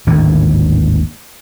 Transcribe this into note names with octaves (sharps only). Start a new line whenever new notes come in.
G#1 D#2 A2 D3